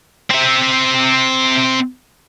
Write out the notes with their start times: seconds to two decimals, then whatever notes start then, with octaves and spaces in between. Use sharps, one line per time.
0.31 C4 E5